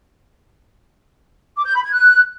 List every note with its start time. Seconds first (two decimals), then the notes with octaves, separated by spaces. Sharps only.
1.56 D6
1.66 G6
1.75 B5
1.84 G#6
1.93 F#6